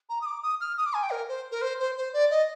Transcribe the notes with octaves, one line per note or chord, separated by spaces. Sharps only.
A#5
D#6
D6
D#6
F6
D#6
D6
G#5
G5
A#4
C5
A#4
C5
C5
C5
D5
D#5